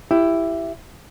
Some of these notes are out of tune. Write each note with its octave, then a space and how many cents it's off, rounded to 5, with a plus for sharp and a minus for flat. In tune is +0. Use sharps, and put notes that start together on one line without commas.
E4 +10 G4 +0